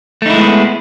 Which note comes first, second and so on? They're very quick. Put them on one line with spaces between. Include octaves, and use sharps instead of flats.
A3 D#4 E4 G#3 B3